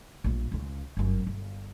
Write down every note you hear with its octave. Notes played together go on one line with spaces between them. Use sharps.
A#1 G2
C#2 C#3
G1 F#2
G1